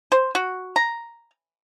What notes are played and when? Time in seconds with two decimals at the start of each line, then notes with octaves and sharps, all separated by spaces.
0.12 C5
0.35 F#4
0.76 A#5